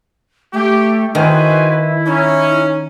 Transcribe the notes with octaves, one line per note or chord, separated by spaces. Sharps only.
A3 G4
D#3 E4 F#4 B4 C5 G#5
C#4 D#4